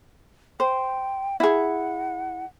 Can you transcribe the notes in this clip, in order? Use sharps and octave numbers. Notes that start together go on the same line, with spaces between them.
C5 G5
E4 G#4 F#5